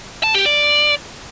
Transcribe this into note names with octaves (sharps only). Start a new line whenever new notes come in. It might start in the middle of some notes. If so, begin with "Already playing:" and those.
A5
G4
D5